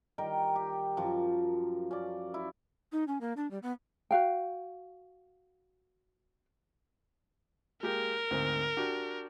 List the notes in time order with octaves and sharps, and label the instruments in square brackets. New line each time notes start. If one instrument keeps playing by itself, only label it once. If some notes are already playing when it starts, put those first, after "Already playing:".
[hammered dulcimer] D#3 G3 A#4 G5
G4
F#2 F3
C#4 D5
E4
[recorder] D#4
C#4
A#3
D4
G3
B3
[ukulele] F#4 F5 G5
[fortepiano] G#3 A#3 G4 [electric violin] A#4
[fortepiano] D2 G#2 C4
D4 F#4 G4